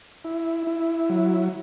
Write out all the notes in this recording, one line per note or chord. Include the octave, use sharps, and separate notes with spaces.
E4
E4
F#3